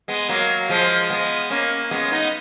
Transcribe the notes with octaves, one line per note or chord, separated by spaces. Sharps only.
G#3 B3
F#3 A#3
F3 G#3
G#3 B3
A#3 C#4
G#3 B3
B3 D#4